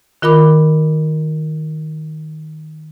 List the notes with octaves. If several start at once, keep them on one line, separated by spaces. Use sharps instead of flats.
D#3 F4 A#4 B5 D6